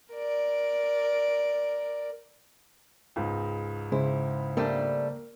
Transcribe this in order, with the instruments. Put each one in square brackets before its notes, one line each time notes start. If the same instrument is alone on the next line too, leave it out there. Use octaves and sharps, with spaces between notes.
[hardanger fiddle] A#4 D5
[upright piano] C#2 G#2
[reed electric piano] C#3 G#3 C5 [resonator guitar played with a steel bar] E4
[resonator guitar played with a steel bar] G3 A3 D4 [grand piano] A#3